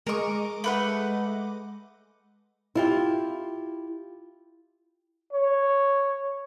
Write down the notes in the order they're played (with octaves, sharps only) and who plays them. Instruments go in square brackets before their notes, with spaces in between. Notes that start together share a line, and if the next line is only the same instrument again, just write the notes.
[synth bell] G#3 D#5 D6 [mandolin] A#4 C#6
[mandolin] A3 B4 F#5
[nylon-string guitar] E4 F4 G4
[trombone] C#5